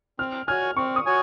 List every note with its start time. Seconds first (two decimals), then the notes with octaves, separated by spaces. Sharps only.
0.19 C4 F6
0.48 F#4 C#5 G#5 F6
0.77 C4 C#6
0.96 D#6
1.06 F#4 C#5 G#5